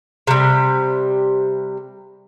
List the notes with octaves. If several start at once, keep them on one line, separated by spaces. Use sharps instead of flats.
C3 G3